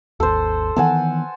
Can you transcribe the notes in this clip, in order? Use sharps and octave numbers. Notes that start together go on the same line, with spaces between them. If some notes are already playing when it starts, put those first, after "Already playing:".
G#1 D#2 A4 C5
D#3 E3 B3 F#5 G#5 A5